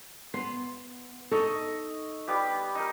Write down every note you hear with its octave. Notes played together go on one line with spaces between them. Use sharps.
B3 C6
D#4 A4 D#5 C#6 E6
G3 B3 G4
D#4 A#4